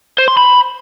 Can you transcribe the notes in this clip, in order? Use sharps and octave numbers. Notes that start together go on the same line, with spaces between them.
C5
C6
B5